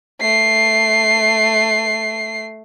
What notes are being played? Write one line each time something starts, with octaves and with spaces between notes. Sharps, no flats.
A3 C7